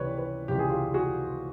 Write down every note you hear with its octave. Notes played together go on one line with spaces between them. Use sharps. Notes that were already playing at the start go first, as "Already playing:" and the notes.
Already playing: C#2 C3 E3 G3 B4 C#5 D5
B4 C#5
C#2 C3 E3 G3 G4
G#4
F4 G4
F#4 G#4